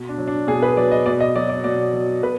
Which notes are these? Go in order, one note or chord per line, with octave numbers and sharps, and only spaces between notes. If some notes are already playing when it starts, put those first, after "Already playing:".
Already playing: B2
D4
F#3
D4
B2 G#4
B4
F#3 D5
D#5
B2 D5
D#5
F#3 D5
D5
B2 D5
F#3
B2 B4